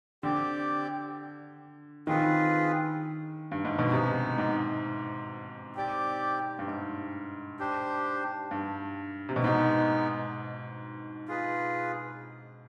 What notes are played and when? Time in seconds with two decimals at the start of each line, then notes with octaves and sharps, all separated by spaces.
0.23 D3 C4 G4 D5
2.07 D#3 C4 F4 G#4 B4
3.52 G2
3.65 G#2
3.79 B2
3.91 C3 G#3 B3 D#4
4.38 G#2
5.75 C4 G4 D5
6.59 G2
6.68 G#2
7.59 D4 G4 C5
8.51 G2
9.29 C3
9.36 B2
9.43 G#2 G#3 B3 D#4
11.28 F4 G#4 B4